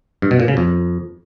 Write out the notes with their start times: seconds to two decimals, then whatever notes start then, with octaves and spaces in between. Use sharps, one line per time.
0.22 G2
0.31 B2
0.40 A#2
0.48 C#3
0.57 F2